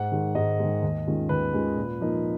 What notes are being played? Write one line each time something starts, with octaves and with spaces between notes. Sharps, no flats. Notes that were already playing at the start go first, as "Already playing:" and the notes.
Already playing: G#2 F#5
D#3 G#3
G#2 D#5
D#3 G#3
D#2
D#3 G#3 C#4 F4
D#2 B4
D#3 G#3 C#4 F4
A#2
F3 A#3 D#4